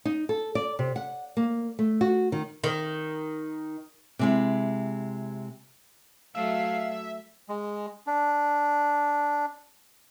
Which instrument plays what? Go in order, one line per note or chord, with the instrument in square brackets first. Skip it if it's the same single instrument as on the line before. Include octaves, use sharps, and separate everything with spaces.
[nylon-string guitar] D#4
A4
D5
C3
F#5
A#3
A3
F#4
D#3
[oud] D#3
[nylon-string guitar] C3 G#3 E4
[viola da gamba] F#3 A3 [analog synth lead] E5 [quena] F5
[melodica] G#3
D4